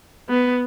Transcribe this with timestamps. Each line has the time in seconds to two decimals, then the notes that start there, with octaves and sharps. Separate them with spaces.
0.29 B3